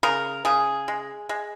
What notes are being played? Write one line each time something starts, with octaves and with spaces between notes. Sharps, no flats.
C#3 A#4
C#3 G#4
G#3
G#3